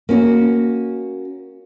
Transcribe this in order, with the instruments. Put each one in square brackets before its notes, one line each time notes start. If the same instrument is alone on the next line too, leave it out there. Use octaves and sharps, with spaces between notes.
[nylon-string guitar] A#3 C#4 F#4